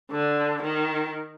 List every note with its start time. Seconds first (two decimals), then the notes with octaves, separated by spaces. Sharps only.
0.12 D3
0.63 D#3